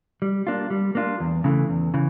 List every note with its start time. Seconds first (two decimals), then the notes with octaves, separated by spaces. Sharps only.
0.22 G3
0.47 A#3 D4 F4
0.70 G3
0.95 A#3 D4 F4
1.20 E2
1.44 C#3 E3 A3
1.70 E2
1.94 C#3 E3